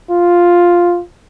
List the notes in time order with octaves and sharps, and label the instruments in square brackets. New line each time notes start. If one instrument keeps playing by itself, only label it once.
[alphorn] F4